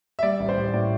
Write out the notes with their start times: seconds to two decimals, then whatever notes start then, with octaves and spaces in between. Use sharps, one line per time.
0.19 E5
0.23 G3 D5
0.40 A1
0.49 C5
0.57 A1
0.73 A2 D5